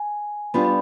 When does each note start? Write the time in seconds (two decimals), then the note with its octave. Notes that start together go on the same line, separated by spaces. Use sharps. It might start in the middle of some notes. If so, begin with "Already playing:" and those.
Already playing: G#5
0.54 G3 B3 D4 F4 B5
0.65 B5